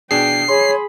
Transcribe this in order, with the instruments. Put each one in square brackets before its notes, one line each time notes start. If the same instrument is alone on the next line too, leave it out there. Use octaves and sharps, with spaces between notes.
[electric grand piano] B2 D4 G#4 [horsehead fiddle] G5 [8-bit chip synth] C7
[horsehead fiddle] G#4 B5 [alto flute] C#5 [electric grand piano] C6